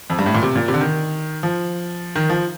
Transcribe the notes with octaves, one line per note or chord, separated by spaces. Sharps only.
F2
G2
A2
A#2
C3
A#2
C3
D3
D#3
F3
D#3
F3